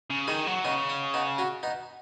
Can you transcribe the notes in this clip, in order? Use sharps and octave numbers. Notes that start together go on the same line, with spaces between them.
C#3
D#3 D#4 G#4
F#3
C#3 B3 D#4
C#4
B3 D#4
C#4 F#4
B3 D#4